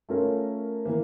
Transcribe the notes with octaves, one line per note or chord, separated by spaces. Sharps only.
A3 C#4 F4 A#4
E3 A#3